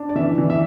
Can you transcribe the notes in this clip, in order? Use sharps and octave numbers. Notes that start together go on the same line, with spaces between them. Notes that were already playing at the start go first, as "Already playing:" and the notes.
Already playing: D4
D5
E3 E5
E3
E5